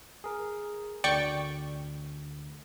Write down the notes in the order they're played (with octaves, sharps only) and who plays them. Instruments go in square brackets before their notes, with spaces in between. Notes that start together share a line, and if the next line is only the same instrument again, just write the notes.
[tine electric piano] G#4 A#4
[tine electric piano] D2 D3 [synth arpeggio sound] D5 G5 C#6